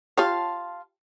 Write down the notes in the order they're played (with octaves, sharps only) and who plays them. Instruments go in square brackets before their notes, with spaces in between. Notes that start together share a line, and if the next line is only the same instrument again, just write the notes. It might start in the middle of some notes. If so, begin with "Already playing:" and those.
[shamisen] F4 G4 C#5 [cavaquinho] F5 A5 C6